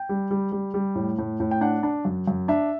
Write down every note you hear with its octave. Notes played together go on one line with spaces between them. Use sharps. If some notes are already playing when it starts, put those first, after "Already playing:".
Already playing: G5
G3
G3
G3
G3
A2
A2
A2
G5
D4 F#5
D4
F#2
F#2
D4 E5